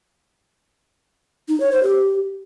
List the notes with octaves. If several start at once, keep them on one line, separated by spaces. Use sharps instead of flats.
D#4
C#5
C5
G4